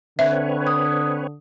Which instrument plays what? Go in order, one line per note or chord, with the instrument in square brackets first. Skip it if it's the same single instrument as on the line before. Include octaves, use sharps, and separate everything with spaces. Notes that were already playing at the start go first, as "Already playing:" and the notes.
[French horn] D3 [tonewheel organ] C4 B4 C#5 [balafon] E5
[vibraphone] D#6